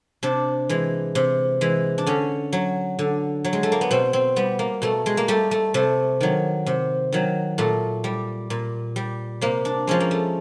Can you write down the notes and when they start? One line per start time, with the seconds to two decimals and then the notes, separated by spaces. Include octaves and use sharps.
0.23 C3 D4
0.69 E3 G#3
1.15 C3
1.61 E3 G#3
1.98 D4
2.06 D3 C#4
2.53 F#3
2.99 D3
3.44 F#3
3.53 G#3
3.63 A3
3.72 A#3
3.81 B3
3.91 B2 C4
4.13 C4
4.36 G3 B3
4.59 A#3
4.82 B2 A3
5.06 G#3
5.17 A#3
5.28 G3 A3
5.51 A3
5.74 C3 A3
6.21 D#3 F#3
6.66 C3
7.12 D#3 F#3
7.58 A#2 A3
8.04 G3
8.50 A#2
8.96 G3
9.41 C3 A#3
9.65 D4
9.87 F3 G#3 C#4
10.00 A#3
10.11 A3